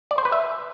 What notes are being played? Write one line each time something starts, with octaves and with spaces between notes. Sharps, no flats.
D5
C5
B4
E5